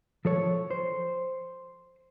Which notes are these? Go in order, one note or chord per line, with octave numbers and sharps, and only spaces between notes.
F3 A4 C#5
C5